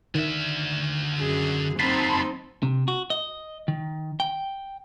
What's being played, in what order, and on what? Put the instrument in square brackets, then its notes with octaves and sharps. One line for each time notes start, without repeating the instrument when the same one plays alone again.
[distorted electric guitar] D3 E5 [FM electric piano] D#3
[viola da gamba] F#2 G#4
[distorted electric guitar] F#3 A#3 [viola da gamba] C4 D#4 [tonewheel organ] A5 B5 C6
[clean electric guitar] C3
F#4
D#5
D#3
G5